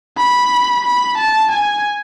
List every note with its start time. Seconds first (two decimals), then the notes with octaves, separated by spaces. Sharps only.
0.18 B5
0.85 B5
1.18 A5
1.52 G#5